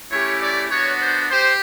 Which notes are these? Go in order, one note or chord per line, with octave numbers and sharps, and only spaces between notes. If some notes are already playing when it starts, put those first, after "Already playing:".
A3 C#4 E4 G4 C#5
D5
B3 D4 F#4 C#5
C5
G4 C5